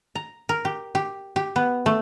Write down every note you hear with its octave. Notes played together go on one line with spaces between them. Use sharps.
A#5
A#4
G4
G4
G4
B3
A3